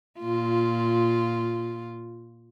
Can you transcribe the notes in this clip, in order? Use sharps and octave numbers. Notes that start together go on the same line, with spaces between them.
A#2 F4